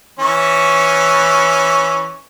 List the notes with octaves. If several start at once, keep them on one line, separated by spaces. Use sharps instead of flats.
E3 C#4 C#6